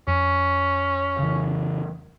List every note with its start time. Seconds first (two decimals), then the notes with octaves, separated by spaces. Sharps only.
0.08 F2 C#4
1.19 C#3 E3